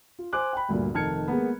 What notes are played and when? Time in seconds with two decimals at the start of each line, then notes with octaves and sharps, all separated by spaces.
0.19 F4
0.33 C5 G#5 C6 D6 F#6
0.53 G5 B5
0.69 D2 G2 A#2
0.94 F1 D#3 A5 F6 G#6 C#7
1.28 G#3 A#3 B3